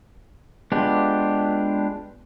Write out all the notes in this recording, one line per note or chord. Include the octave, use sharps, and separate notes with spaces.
G#3 B3 D4 F4 G4